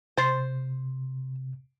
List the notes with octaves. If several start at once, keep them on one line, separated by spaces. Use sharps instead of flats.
C3 C5 C6 A6 C7